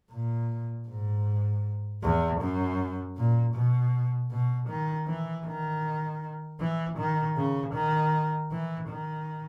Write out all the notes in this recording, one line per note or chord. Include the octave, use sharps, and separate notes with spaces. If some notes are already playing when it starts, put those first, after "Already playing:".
A#2
G#2
E2
F#2
A#2
B2
B2
D#3
E3
D#3
E3
D#3
C#3
D#3
E3
D#3